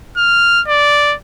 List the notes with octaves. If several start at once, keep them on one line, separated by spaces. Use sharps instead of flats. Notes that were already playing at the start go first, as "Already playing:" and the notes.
F6
D5